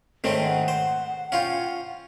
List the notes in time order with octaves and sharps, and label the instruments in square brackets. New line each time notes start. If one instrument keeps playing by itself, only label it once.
[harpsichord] G#2 D#3 C4 [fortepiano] A3 C#5
[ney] F#5
[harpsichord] C5
[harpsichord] C#4 F4 [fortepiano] F5 G5